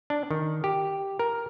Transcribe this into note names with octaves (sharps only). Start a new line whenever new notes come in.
D4
D#3
G4
A#4